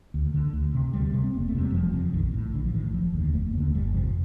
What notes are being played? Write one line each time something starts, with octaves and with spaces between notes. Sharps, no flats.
D2
D3
D2
C3
D2 G3
C3
C4
F1 A#3
A3
F2 C3
G3
F1 F3
F2 C3
F3
A#1 D#3
A2
A#1 D3
F3
A2 D#3
F1 F3
D#2 D3
F1 A3
D#2 D3 A#3
G1 G3
F2 C3 F3